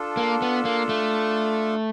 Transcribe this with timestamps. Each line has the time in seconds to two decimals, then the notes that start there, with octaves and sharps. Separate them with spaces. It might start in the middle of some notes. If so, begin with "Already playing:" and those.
Already playing: D4 F4 A4
0.17 A#3
0.42 B3
0.65 A#3
0.89 A3